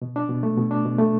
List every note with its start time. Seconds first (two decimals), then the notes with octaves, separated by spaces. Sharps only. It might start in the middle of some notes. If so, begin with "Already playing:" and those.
0.02 B2
0.16 D4
0.29 B2
0.43 A3
0.57 B2
0.71 D4
0.85 B2
0.99 A3